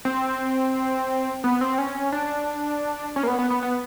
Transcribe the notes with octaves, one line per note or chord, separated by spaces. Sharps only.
C4
B3
C4
C#4
D4
C#4
A#3
B3
B3
B3
B3